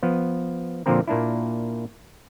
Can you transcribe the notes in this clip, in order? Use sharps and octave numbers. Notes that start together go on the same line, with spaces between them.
F3 B3
A#2 D3 F3 A#3 C4 A#4
A#2 A#3 D4 E4